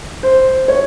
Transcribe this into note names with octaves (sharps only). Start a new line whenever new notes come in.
C5
C#5